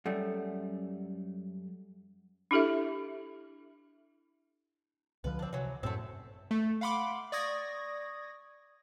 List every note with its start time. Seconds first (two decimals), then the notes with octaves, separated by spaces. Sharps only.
0.06 F#2 G3 A3
2.51 D4 E4 G4 A4 E5
5.24 C#2 D3 F3 B4
5.39 C4 D4
5.53 C3 E3 F#3
5.83 F#2 A2 A3 C4
6.51 A3
6.81 F5 F#5 B5 C6 D6 D7
7.32 D5 C#6 D#6 G#6 A#6